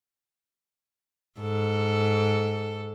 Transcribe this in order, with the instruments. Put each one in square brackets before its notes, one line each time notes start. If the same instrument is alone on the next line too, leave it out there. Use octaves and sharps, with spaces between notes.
[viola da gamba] G#2 A4